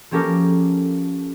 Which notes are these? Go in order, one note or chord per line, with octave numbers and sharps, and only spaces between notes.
F3 A#3 C#4 G4 A4 A#4